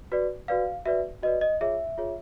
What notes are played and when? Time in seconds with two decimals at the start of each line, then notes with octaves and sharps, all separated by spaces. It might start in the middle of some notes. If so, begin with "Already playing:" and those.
0.12 F#4 B4 D5
0.48 F#4 B4 D5 F5
0.86 F#4 B4 D5 E5
1.23 F#4 B4 D5 D#5
1.41 D#5
1.61 F4 G#4 C#5 E5
1.98 F4 G#4 C#5